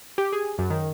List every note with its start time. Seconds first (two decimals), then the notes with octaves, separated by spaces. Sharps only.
0.18 G4
0.32 G#4
0.58 F#2
0.70 D#3